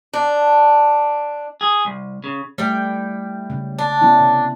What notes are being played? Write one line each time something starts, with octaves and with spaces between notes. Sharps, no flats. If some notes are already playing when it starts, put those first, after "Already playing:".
D4
G#4
C2
C#3
G3 A3 E4 G5
C#3 C#4
D4
B3 C#4 E4
C3